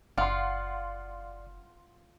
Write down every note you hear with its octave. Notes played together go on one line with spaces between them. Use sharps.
F#1 F4 D5 F5 F#5 C6